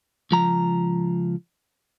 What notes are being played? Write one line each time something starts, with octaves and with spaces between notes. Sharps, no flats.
C#2 F3 A#5